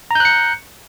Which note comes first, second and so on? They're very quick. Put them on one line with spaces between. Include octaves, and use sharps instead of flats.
A#5 G6 F#6 C#7